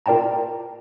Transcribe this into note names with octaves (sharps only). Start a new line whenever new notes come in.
F4 A#4 D5 G5 A5 A#5